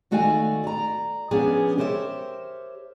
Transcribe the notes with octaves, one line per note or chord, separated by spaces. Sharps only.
D#3 A3 F#4 D5 F5 G#5
D5 A#5
F3 B3 C#4 D4 G#4
G4 A#4 C5 C#5 E5